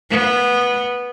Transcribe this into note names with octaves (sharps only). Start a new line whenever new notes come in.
B3